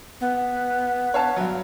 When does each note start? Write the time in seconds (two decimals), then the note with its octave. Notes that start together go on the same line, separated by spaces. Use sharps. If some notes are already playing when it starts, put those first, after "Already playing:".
0.21 B3
1.14 C#5 F5 A5
1.36 G2 F#3